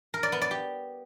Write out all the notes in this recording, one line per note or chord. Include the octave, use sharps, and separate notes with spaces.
A#4
D5
B3
D5
G4